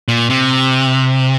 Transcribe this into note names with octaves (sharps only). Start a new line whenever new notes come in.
A#2
C3